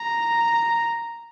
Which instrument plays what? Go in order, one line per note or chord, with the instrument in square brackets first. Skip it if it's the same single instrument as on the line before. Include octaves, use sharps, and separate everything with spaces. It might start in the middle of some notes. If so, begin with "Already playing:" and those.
Already playing: [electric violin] A#5